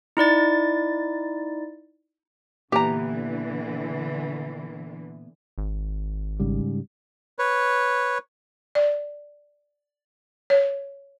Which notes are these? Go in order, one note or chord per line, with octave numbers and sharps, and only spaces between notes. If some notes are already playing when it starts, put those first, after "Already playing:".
D#4 E4 D5 A6
A#2 D3 E3 B3 E4 G4 A#5
G#1
G#2 C#3 G3
B4 C#5
D5
C#5